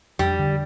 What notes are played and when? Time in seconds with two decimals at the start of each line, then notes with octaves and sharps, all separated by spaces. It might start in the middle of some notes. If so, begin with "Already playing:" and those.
0.19 F2 G3
0.39 D3